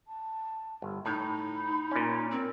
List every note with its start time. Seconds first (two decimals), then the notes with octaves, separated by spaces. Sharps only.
0.08 A5
0.82 G1
1.06 A2 D#4 B5
1.91 A#2 C#4
2.31 C4 A#4